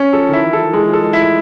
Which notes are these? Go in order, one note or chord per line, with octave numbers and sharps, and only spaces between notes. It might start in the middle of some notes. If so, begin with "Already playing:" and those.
Already playing: C#4
F3 A4
D#3 E4
E3
A4
F3
E3 G#3
F3 A4
G#3
E4
A3